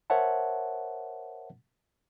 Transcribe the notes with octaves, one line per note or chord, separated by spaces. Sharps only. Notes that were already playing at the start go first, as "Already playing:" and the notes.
A#4 C5 C#5 E5 F#5 A5